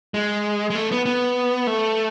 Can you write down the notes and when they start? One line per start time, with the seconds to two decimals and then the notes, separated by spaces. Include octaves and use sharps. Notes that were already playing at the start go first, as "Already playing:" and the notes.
0.14 G#3
0.70 G#3
0.75 A3
0.91 B3
1.06 B3
1.67 A3